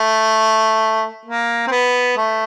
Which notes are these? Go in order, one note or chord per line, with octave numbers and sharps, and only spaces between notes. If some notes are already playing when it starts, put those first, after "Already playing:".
Already playing: A3
A#3
C4
B3
A3